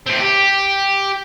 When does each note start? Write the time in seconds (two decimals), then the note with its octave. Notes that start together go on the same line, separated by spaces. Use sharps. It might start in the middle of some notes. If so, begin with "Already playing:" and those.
0.06 A2 C4
0.20 G4